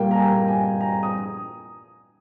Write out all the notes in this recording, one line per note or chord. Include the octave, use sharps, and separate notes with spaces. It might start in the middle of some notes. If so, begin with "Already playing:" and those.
Already playing: A#2 G3 A#3 G5
A#5
G#5
G#5
A#5
D#6